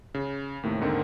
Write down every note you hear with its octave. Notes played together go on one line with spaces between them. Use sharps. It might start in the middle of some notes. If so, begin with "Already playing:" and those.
C#3
D#2 A2 C3
D#2 G#2 D3 D#3 C4